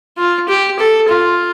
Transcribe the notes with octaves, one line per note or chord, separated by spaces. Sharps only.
F4
G4
A4
F4